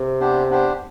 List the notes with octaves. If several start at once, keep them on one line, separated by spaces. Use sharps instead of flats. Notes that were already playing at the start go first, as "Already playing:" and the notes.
Already playing: C3
B3 D4 G4 C5
B3 D4 G4 C5